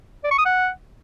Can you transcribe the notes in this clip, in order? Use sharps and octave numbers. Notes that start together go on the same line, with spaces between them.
D5
C#6
D#6
F#5